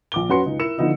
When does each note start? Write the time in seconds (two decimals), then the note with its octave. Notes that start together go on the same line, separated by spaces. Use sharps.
0.12 A#1 D6 G7
0.29 F#2 C#4 F#4 B4 C6 C#7
0.46 C#2 D#4
0.59 E4 A#4 E6 C#7 E7
0.78 D3 F3 B3 D#4 E4